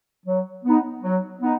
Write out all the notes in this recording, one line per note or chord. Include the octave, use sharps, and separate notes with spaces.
F#3
B3 D#4
F#3
B3 D#4